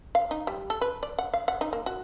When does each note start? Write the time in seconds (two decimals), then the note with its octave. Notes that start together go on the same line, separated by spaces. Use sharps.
0.15 F5
0.31 D#4
0.47 G3
0.70 A4
0.81 B4
1.03 D5
1.19 F#5
1.33 F5
1.48 F#5
1.61 D#4
1.73 A#3
1.86 F#4